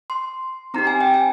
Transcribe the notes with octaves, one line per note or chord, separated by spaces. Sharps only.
C6
C4 D#4 G4 A#5
G#5
G5
G#5